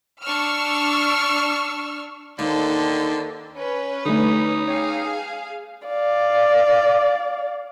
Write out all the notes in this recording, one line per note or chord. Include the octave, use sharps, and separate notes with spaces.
D4 C#6 E6 F6
D#2 D3 D#3 A4 C5
C#4 B4
D3 G3 A3 D#4
G#4 C#5 F5 G5 E6
D5 F5